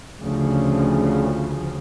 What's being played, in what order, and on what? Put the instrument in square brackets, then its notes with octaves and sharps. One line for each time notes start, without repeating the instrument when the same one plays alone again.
[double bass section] D2 C#3 F3